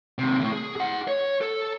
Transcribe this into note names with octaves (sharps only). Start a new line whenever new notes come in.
D#2 C3
D2 A2
G#4
G#4 F#5
C#5
A4